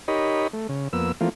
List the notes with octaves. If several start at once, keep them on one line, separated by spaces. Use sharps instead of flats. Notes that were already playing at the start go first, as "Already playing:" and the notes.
D#4 G4 A#4 C#5 D#5 B5
A3
C#3
F2 A#3 B3 E6
E3 F3 A3 A#3 C4 F4